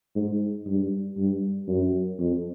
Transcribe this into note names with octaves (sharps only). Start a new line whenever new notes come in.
G#2
G2
G2
F#2
F2